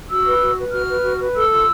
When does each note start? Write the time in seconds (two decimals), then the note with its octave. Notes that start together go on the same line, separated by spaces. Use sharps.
0.09 F#4 E6
0.26 B4
0.41 F#4
0.57 B4
0.73 F#4 F6
0.89 B4
1.04 F#4
1.21 B4
1.36 A4 E6
1.51 F4